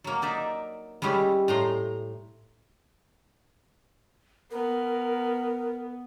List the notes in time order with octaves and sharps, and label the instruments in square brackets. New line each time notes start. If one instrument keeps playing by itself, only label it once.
[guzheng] F#3 A#3
D#4 D5 E5
G3 G#3 C#4 E4 G4
A2 A#5 C6
[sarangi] B3 [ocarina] A#4